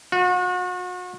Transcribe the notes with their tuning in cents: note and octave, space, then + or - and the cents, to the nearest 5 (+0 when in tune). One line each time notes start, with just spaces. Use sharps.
F#4 -40